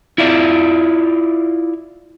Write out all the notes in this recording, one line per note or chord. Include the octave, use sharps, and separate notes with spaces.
E4 F4 D5 E5